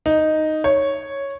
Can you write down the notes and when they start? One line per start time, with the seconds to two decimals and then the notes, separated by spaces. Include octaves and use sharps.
0.06 D#4
0.64 C#5